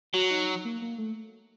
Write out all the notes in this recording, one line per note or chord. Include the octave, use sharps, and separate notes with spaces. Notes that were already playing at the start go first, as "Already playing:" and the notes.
F#3 F#4
D#4
A#3
A#3
A3